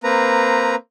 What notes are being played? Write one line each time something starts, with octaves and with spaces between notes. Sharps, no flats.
A#3 C4 B4 A#5